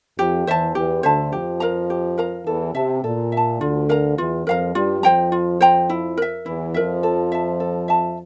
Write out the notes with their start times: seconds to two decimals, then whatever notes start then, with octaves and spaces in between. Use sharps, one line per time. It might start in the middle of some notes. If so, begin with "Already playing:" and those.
0.18 F2 F3 G4
0.47 E2 E3 C5 E5 A5
0.75 E2 E3 G4
1.03 D2 D3 C5 E5 A5
1.32 F2 F3 G4
1.60 A#4 F5 A#5
1.90 G4
2.18 A#4 F5 A#5
2.46 E2 E3 A4
2.75 C3 E5 A5
3.03 A#2 A4
3.32 E5 A5
3.60 D2 D3 F4
3.89 A#4 F5 A#5
4.18 E2 E3 F4
4.46 F2 F3 A#4 F5 A#5
4.75 G2 G3 F4
5.03 F2 F3 C5 G5 A#5
5.32 F4
5.61 C5 G5 A#5
5.90 E4
6.17 A#4 E5
6.46 E2 E3 E4
6.74 F2 F3 A#4 E5
7.03 A4
7.32 E5 A5
7.60 A4
7.88 E5 A5